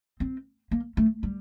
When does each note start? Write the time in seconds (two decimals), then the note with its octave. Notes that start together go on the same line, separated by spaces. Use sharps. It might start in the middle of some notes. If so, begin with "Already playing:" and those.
0.20 C4
0.71 A#3
0.97 A3
1.23 G3